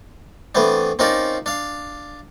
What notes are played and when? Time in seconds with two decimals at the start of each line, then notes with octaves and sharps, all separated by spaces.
0.55 E3 A3 B3 C4 D4
0.99 C4 C#4 D#4 F4 A#4 D5
1.46 D4 F5